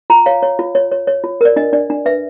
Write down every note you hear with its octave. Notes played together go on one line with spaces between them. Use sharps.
F4 A#5
C#5 F5
C#5
F4
C#5
C#5
C#5
F4
A#4 D5
D4 D#5
D4 D5
D4
B4 E5